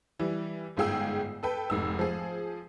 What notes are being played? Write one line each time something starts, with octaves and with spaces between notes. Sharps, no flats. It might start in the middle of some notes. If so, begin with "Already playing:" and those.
E3 G3
G1 G#2 F4 G#4 G5 E6
A4 B4 G5
F1 G#2 E6
F3 G#4